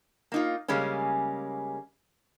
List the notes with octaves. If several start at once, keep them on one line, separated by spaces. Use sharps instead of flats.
A#3 D#4 F4
C#3 G3 G#3 A#3 C#4